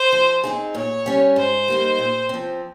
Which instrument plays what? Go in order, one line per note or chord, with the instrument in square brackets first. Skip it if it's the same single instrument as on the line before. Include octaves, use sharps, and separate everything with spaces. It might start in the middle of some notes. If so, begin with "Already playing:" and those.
Already playing: [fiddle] C5
[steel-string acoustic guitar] F3
C4 D#4 G#4
[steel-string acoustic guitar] A#2 [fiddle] C#5
[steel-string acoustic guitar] G3 C#4
[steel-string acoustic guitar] G#2 [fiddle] C5
[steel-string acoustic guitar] G3 A#3 D#4
A#2
F3 C4